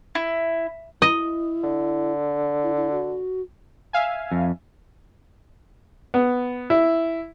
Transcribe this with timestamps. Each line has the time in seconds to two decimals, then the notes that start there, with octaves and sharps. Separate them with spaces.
0.15 E4
1.02 E4 D#5
1.64 D3
2.63 E4
2.77 E4
2.92 F#4
3.93 E5 F5 G#5
4.32 F2
6.14 B3
6.70 E4